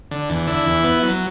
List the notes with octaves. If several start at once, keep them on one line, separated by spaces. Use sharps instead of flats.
D3
E2
D3 E4
E2
B3
F#3